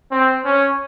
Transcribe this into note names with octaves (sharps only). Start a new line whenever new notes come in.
C4
C#4